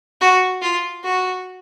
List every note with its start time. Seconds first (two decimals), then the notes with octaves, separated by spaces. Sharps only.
0.21 F#4
0.62 F4
1.04 F#4